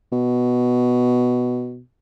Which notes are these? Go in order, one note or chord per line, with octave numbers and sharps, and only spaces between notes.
B2